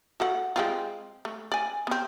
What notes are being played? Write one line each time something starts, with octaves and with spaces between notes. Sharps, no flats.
F#4 A4 F#5
G#3 C4 F4
A3
D5 G#5
B3 C4